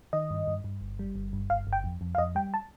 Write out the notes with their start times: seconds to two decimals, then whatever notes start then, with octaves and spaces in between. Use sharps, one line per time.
0.13 D#3 D#5
0.31 G2
0.47 G2
0.64 G2
0.81 G1
0.99 G3
1.15 G1
1.33 G2
1.50 G1 F5
1.67 G1
1.73 G5
1.84 F2
2.01 F2
2.15 F5
2.18 F2 D#5
2.35 G3 G5
2.54 A5